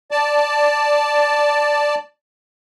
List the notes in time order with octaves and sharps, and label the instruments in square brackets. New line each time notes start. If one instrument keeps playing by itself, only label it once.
[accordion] D5 A5